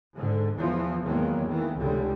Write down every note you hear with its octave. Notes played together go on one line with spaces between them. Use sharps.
G#2 D3
E2 E3 F3
E2 D#3 F#3 G#3 A#3
D#3 E3
F1 C#2 D3 G3 G#3